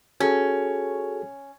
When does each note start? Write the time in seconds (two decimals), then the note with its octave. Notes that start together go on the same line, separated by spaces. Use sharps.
0.20 C#4 F#4 G#4 A4